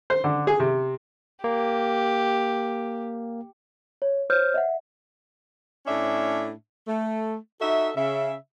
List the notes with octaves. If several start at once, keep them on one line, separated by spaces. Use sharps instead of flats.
C5
D3
G#4
C3
A#3 G4
C#5
C5 C#5 F6 G6
D#5 E5 F#5
A2 C#4 D4 E5
A3
D#4 F#4 A4 E5
C#3 E5